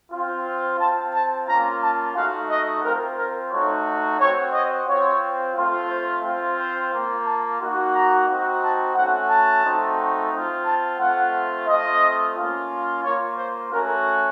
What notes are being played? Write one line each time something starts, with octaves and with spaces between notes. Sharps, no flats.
C4 F4
C4 F4 A5
A5
A#3 C#4 F4 A#5
A5
A3 D#4 F#4 F5
D#5
C4 F4 A#4
A#4
A3 D#4 F#4 C#5
C4 F#4 C#5
D#5
C4 F4 C#5
A3 C4 F4
C5
C4 F4
C5
A#3 F4
A5
A#3 D#4 F#4
A#5
C4 D#4 F#4
A5
A3 C#4 F#4 F#5
A5
A3 C4 D#4 F#4
C4 F4
A5
A3 C4 F4 F#5
A3 C4 F4 D#5
A#3 C#4 F4
A#3 F4 C#5
C5
A3 C#4 F#4 A#4